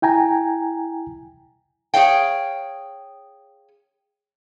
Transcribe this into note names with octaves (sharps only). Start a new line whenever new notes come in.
E4 G5 G#5 A#5
G#4 A#4 C#5 F5 G5